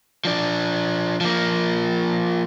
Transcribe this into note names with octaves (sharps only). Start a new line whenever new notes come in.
F3 D4
F3 A#3